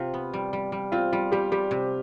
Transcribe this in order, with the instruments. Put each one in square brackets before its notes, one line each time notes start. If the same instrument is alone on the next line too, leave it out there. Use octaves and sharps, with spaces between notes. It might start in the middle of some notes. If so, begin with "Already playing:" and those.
Already playing: [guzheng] C3 [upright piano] F4
[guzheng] B3
G3
G3
G3
[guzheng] C4 [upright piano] F4
[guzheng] G3 [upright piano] F4
[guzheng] G3 [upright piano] G4
[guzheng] G3 [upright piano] G4
[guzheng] C3